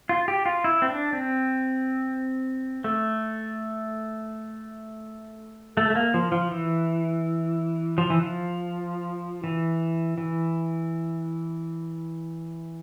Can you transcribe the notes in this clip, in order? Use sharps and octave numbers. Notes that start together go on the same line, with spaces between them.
F4
G4
F4
E4
C4
D4
C4
A3
A3
A3
A#3
F3
F3
E3
F3
E3
F3
E3
E3